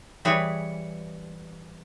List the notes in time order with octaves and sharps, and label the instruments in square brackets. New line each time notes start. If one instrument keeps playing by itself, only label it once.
[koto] E3 G3 G#4 B4 C#5